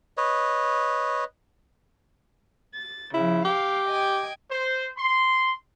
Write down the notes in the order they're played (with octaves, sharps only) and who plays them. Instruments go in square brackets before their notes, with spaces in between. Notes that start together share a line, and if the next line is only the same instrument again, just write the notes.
[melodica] B4 C#5 D#5
[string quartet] A6
[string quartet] C#3 F3 [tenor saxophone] E4
[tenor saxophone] G4 [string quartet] F5 D6
[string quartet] D#5 G5 G#5
[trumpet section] C5
C6